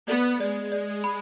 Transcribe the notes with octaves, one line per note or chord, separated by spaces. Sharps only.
B3 D5
G#3 D5
D5
B5